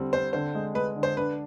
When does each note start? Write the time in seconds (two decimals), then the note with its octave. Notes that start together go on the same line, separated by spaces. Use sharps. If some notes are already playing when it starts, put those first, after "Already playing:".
Already playing: D3 G3 C4
0.12 C4 C5
0.33 D3 C5
0.55 G#3
0.75 G#3 B4
0.96 D3
1.03 C5
1.17 D4 B4